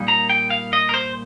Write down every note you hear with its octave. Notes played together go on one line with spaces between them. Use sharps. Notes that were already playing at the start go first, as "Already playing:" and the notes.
Already playing: A#2 G3 A#3 D#4
A#5
G5
F5
D#5
A#4
C5